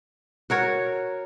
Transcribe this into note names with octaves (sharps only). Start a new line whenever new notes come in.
F#4 A#4 C#5